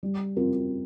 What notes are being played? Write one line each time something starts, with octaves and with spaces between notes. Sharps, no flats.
G3
C4 F4 A#4